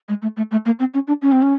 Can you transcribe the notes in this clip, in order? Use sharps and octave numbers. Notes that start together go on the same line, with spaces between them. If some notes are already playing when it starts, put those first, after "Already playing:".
G#3
A3
A3
A3
A#3
C4
C#4
D4
C#4
C4
C#4